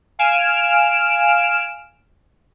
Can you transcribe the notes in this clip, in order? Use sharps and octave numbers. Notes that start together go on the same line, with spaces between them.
F5 G#5 F6 D7 E7